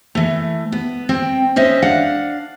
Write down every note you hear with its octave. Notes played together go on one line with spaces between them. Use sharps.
E3 A3
B3
C4 G5
C#4 C5 D#5 E5
D4 F5 F#5